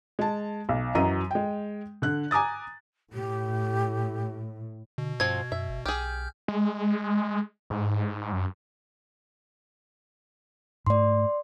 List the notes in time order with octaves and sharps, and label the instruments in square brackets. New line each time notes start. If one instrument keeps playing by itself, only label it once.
[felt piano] G#3 A5
B1
F#2 E3 F#3 D#5 A#5 D#7
G#3 G5
D3 F#6
G#5 A#5 D6 D#6 A6
[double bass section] A2 [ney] G4
[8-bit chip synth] B2 [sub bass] D3
[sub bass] G2 [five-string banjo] F3 C4 [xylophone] G#6
[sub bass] F#2 [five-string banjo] E5
[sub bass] G1
[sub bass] B1 [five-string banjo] G4 G#4 [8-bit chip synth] F6 G6
[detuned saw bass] G#3
G#2
F#2
[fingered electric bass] G#2 A3 [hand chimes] D5 C6